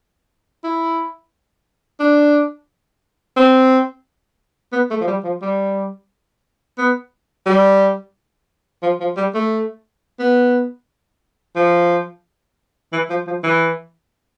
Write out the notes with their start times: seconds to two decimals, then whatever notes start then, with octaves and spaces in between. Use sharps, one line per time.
0.64 E4
2.00 D4
3.37 C4
4.72 B3
4.90 A3
5.01 F3
5.07 G3
5.24 F3
5.42 G3
6.78 B3
7.46 G3
8.83 F3
9.00 F3
9.17 G3
9.34 A3
10.19 B3
11.56 F3
12.92 E3
13.10 F3
13.27 F3
13.44 E3